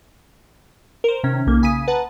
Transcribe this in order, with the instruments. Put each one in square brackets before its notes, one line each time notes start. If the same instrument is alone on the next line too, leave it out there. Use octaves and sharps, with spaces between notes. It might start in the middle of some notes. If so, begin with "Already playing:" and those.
[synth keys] A#4 C5
C3 D#3 C#4
B1 A#3
C#3 G#5 D#6 B6 D#7
B4 F#5 A5 A#5